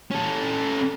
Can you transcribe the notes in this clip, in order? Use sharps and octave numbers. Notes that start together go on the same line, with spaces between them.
C#4 A4